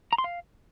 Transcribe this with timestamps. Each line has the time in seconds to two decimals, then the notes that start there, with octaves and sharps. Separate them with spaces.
0.13 A#5
0.18 C6
0.24 F5